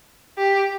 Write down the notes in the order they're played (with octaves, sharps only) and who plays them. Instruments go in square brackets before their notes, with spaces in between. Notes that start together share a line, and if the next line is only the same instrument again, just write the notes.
[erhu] G4